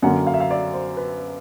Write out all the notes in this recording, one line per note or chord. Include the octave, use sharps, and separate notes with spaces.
F#2 D3 F#3 A#3 F#5
F5
E5
F5
D5
C5
B4